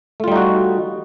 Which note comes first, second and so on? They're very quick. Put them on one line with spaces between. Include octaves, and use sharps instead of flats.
A3 F4 G3 D#4 F#4